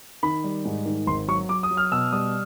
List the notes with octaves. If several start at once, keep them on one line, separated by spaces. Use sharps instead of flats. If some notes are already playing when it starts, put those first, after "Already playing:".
D#3 B5
G3
G#2
D#3
G#1 C6
F#3 C#6
F#3 D6
D#6
F#3
F6
B2 E6
G3 D#6